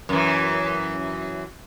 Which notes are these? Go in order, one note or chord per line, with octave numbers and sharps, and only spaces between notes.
F#2 E3